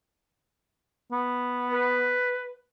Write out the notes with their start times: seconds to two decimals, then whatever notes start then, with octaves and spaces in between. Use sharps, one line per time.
1.12 B3
1.71 B4